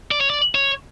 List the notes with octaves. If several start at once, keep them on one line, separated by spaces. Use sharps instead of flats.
D5
C#5
D5
C#5